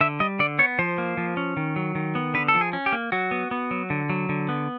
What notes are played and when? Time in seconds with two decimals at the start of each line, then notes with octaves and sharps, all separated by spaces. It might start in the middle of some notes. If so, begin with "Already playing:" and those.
0.01 D3 E5
0.20 G3 D#5
0.39 D3 D5
0.59 B3 C#5
0.79 F3 C5
0.98 A#3
1.17 F3
1.37 C#4
1.57 D#3
1.76 F#3
1.95 D#3
2.15 B3
2.34 D3 B4
2.48 A4
2.54 F3
2.61 G#4
2.73 C#4
2.86 G4
2.92 A#3
3.12 F#3 F#4
3.31 B3
3.51 B3
3.71 F#3
3.90 D3
4.10 F#3
4.29 D3
4.49 B3